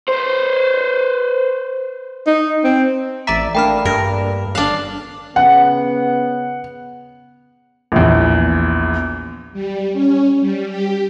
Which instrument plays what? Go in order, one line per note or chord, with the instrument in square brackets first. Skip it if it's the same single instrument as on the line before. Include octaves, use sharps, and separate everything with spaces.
[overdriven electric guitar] B4 C5
[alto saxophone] D#4
C4
[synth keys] A1 D5 E5 [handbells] A#5 B6
[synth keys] A3 A#3 D4 [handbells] G5 B5 F6
[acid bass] G2 [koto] A#4
[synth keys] G1 F#6 [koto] D4 F5
[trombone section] C#3 B3 [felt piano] F#5
[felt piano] A#1 E2
[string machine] G3
C#4
G3
G4